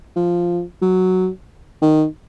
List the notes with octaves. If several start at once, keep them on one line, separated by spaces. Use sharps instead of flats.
F3
F#3
D#3